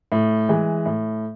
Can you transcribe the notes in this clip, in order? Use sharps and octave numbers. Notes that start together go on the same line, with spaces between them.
A2
E3 G#3
A2